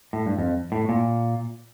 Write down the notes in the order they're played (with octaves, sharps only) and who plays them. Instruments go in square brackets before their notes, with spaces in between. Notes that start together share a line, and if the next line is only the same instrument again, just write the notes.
[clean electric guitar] A2
G2
F2
A2
A#2